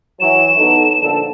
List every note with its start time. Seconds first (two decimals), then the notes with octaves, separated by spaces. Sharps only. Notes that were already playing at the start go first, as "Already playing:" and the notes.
0.20 E3 F#3 E7
0.58 B3 D#4 A4
1.00 A#1 D3 A4